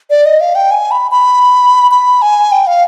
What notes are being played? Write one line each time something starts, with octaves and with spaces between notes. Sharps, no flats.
D5
D#5
F5
G5
G#5
B5
B5
B5
G#5
G5
F5